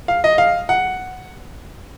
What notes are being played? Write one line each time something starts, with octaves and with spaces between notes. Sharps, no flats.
F5
D#5
F5
F#5